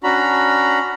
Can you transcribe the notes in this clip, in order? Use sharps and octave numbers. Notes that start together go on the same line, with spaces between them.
C#4 D4 F#4 A#5 B5